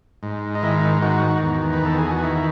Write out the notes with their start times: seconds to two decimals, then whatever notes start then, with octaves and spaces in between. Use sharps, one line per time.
0.23 G#2
0.55 D#4
0.63 D#3 E4
1.02 D#3 F#4
1.43 E2
1.73 B4
1.83 E2 A4
1.98 G#4
2.11 F#4
2.23 D#3 E4